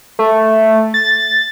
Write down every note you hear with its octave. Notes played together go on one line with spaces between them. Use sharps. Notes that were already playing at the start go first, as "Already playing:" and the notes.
A3
A6